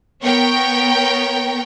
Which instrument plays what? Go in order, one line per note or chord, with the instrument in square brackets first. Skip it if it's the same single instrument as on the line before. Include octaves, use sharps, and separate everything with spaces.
[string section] B3 A#4 C#5 G5